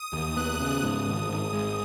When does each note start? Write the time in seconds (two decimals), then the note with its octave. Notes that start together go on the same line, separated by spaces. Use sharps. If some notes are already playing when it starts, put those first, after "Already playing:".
Already playing: D#6
0.13 D#2
0.37 B3 F#6
0.60 C#3
0.83 G#2 D#6
1.07 G#1
1.30 G#1
1.53 G#3